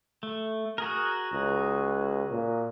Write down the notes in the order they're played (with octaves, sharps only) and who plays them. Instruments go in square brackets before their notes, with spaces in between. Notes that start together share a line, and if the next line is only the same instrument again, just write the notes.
[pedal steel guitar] A3
F#4 G#4 A#4
[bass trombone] C#2
A#2